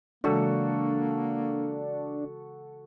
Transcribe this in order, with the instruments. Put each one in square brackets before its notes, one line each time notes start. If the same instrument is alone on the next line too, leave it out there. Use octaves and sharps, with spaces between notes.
[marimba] C#3 E3 G#3 [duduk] A#3 [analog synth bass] D4 [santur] F#4 A4